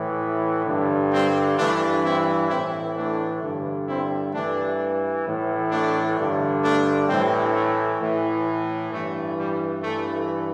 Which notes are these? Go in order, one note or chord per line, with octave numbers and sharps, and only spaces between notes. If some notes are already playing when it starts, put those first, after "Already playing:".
Already playing: A2 E3
G2 D3
G3 C4
G2 E3 A3 D4
C4 E4
A2 E3 C4 E4
A3 D4
G2 D3
C4 E4
G2 E3 A3 D4
A2 E3
A3 D4
G2 D3
A3 D4
A2 E3 G3 C4
A3
A2 E3
G2 E3 A3
G3
G2 E3 A3